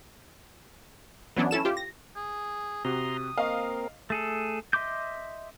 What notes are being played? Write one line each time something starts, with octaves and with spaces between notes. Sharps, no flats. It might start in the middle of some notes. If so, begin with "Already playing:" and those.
E3 F#3 B3 C#4 D4
C#4 E4 A4 E7
F4 G4
A#6
G#4
C3 F#4 A#5 C6 D#6
A#3 C4 A#4 D#5 F5 C#6
A3 G#4 A4
D#5 E5 C6 D6 G6